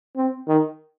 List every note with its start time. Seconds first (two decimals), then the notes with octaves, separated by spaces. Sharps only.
0.16 C4
0.48 D#3